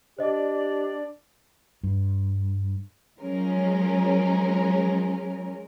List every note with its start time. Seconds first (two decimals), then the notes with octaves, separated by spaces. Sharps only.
0.19 D4 G4 C5 D5 D#5
1.83 G2
3.20 F3 F#3 G#3 C#4 A#4